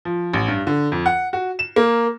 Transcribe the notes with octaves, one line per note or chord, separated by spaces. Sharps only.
F3
A1
G2
D3
F2
F#5
F#4
E7
A#3